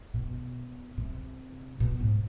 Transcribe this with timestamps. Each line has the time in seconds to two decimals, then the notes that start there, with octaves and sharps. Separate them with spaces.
0.14 B2
0.98 C3
1.80 B2
2.00 G#2